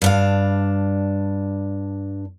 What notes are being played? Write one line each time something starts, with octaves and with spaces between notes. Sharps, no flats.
G2 D4 F5